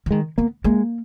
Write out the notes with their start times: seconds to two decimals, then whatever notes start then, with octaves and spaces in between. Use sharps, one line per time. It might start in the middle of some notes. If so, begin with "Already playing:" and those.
0.06 E3
0.11 D#3 G#3
0.38 A#3 B3
0.64 G#3 A#3